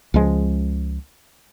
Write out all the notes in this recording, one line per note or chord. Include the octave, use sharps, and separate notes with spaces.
C#2 F3 G#3